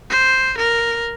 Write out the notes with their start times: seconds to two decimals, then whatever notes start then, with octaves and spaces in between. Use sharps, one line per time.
0.10 C5
0.58 A#4